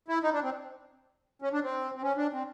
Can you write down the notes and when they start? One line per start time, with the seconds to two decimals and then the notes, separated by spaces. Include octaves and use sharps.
0.08 E4
0.23 D#4
0.33 D4
0.43 C4
1.42 C#4
1.53 D4
1.63 C4
1.96 C4
2.03 C#4
2.17 D4
2.33 C4